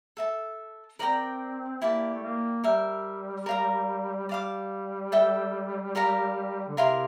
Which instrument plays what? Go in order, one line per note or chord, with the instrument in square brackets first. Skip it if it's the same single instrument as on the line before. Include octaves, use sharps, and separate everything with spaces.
[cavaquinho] A4 E5 A5
[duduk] C4 [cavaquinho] A#4 D5 G5 A#5
[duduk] A#3 [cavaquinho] E4 G4 D5 A5
[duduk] A3
A#3
[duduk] G3 [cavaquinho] A#4 E5 G5
[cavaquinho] A#4 F5 A#5
[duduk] G3 [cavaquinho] D5 F5 A5 D6
[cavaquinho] A4 E5 G5
G4 A#4 F5 A#5
[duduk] D3
[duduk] C3 [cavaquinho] E4 A#4 F5 C6